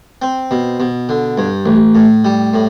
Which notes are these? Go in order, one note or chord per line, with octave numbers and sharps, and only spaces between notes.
C4
B2
B2
D3
G2
A1
A2
G3
A2